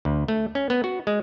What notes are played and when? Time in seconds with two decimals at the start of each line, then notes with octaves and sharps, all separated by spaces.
0.05 D2
0.28 A3
0.55 C#4
0.70 B3
0.84 F#4
1.07 G#3